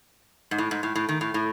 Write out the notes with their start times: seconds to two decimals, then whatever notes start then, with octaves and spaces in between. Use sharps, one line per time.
0.51 G#2
0.58 A2
0.71 G#2
0.83 A2
0.95 A2
1.09 D#3
1.21 A2
1.34 A2